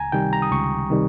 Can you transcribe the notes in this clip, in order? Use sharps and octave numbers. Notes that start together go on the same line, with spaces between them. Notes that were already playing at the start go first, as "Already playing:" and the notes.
Already playing: C#2 G#5 A#5
C3 D#3 G3 G5
A#5
D#6
C#2 C#6
C3 D#3 G3